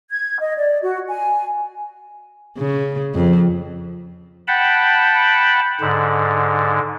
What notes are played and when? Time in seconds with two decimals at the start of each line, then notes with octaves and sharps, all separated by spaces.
0.10 G#6
0.40 D#5
0.56 D5
0.81 F#4
1.08 G#5
2.58 C#3
3.15 F2
4.48 F#5 G5 A5 B5
5.81 G#2 D3